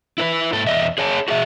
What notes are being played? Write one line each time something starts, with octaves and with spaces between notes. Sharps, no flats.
E4 A#4 B4
G#2 A4
E2 D#5 E5
G#4 C#5 G#5 A5
F#4 G#4 E5